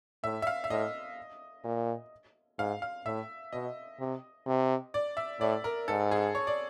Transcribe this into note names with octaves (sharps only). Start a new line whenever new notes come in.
A2 E5
E5
F5
E5
A2 D#5
A#2
G#2 F5
F5
A2 E5
B2 D#5
C3
C3
D5
E5
A2 D5
A#4
G#2 A4
G#4
C#5
D5